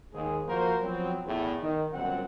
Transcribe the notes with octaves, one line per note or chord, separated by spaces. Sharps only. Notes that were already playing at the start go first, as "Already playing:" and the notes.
D#2 G#2 G#4
F3 A#3 F#4 A#4 C5
F3 F#3 B3 C4
E2 A2
D#3
G1 F#2 A#2 C4 F#5